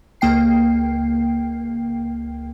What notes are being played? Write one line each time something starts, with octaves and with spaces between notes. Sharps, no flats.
C#2 A#3 G5 C7